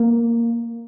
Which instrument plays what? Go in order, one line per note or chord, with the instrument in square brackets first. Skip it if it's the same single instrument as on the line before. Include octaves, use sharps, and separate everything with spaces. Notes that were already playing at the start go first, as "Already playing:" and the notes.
Already playing: [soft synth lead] A#3